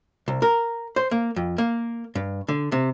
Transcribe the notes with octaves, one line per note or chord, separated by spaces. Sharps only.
C2
A#4
C5
A#3
F2
A#3
G2
D3
C3